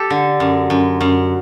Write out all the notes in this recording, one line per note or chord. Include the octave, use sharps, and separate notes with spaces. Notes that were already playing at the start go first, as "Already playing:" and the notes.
Already playing: G4 A4
D3
F#2
F#2
F#2